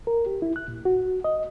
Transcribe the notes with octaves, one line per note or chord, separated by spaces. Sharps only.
A#4
G4
E4
F#6
A#2
F#4
D#5